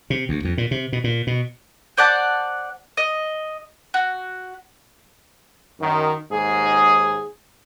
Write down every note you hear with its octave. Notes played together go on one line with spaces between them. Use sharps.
C3
D2
F2
A#2
C3
B2
A#2
B2
C5 D5 F#5 A5
D#5
F#4
F#2 D#3
D#2 G#2 G#4